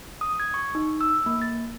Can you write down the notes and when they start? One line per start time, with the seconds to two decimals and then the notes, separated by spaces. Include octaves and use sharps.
0.21 D#6
0.40 G#6
0.54 C#6
0.75 D#4
1.01 E6
1.26 A#3
1.42 A6